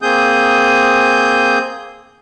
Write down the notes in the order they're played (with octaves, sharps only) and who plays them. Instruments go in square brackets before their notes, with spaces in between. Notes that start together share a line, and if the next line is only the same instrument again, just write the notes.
[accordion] A#3 C4 G#4 D#6 G6